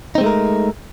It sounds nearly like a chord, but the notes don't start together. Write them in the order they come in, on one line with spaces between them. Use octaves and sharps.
D#4 C4 G#3 A3 A#4